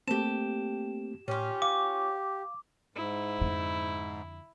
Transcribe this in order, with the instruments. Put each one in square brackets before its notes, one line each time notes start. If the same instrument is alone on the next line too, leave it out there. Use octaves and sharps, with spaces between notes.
[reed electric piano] A3 A#3 C4 [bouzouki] G4 A5 [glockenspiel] E7
[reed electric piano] A2 [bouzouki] C#4 F4 [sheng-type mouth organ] G4
[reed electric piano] F5 [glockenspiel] D6
[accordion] G#2 [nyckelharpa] E4
[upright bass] F2 D3